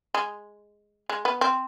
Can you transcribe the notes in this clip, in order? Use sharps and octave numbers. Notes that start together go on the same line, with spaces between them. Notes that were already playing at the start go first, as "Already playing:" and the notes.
G#3
G#3
B3
C4